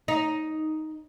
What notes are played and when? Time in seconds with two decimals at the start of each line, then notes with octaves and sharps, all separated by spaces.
0.08 D#4